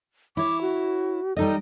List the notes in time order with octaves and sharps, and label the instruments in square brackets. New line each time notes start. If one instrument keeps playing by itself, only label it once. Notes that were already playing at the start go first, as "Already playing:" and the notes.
[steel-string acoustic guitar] E4 C#5 [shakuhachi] D6
[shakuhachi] F#4
[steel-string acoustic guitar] G3 D#4 D#5 [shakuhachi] A4